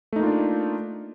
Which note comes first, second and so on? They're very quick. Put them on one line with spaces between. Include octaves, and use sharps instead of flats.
A3 D#4 A#3 F4 D4